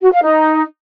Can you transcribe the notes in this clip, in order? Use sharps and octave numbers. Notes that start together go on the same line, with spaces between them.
F#4
F5
D#4